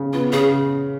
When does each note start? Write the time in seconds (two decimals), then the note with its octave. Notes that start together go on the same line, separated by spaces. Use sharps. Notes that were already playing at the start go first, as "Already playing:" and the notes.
Already playing: C#3
0.13 B3 F4
0.33 C#3 G#4